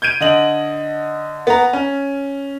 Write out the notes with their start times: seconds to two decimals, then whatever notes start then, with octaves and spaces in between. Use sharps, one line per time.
0.02 G6 G#6 D7 D#7
0.20 D3 D#5 F#7
1.47 B3 A#5
1.73 C#4